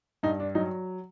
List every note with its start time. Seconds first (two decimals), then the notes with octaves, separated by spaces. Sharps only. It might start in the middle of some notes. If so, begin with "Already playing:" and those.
0.23 G2 D#4
0.40 D4
0.55 F#3 D#4